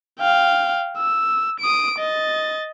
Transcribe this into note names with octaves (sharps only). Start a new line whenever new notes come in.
F5 G5
E6
D#6 D7
D#5 A6